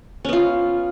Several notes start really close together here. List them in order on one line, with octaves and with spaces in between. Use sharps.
C#4 B3 F4